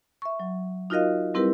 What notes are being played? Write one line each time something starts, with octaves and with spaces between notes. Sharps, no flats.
E5 C#6
F#3
D#4 F4 F#4 A#4 D#5 F5
G3 C4 E4 G4 A#4 B4